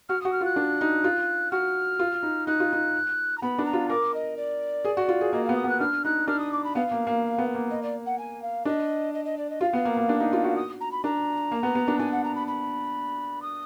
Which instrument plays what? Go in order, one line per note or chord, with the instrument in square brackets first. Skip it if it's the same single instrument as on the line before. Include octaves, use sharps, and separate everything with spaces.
[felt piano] F#4 [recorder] F6
[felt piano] F#4 [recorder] D#6
[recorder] F6
[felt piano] F4
[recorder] F#6
[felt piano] D4
D#4
F4
[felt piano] F#4 [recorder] F6
[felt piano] F4
D#4
[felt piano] D#4 [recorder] F#6
[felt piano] F4
D#4
[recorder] A#5
[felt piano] B3 [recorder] B5
[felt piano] D4
[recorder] A#5
[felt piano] F4
[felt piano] A#4 [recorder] D6
[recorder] D#5
D5
[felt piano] G#4
F#4
F4
G#4
[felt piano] A#3 [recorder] D#5
[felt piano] B3 [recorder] F5
[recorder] D#6
[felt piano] B3
[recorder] F#6
[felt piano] D4 [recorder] F6
[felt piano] D#4 [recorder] F#6
[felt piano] D4 [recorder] F6
[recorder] D#6
D6
B5
[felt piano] B3 [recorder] F5
[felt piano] A#3
A#3
B3
A#3
[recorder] D#5
D5
F#5
G#5
F5
[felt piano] D4 [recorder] D#5
[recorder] D#5
D#5
D5
D#5
[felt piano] F4 [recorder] F5
[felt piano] B3
A#3
A#3
D4
D#4
F4
F#4
[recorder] D#6
A#5
B5
[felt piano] D4 [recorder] A#5
[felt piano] A#3
B3
B3
D4
[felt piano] D4 [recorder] G#5
[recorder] F#5
A#5
B5
B5
D#6